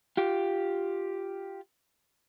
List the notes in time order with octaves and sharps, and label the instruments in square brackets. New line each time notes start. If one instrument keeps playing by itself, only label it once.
[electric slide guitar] F4 G4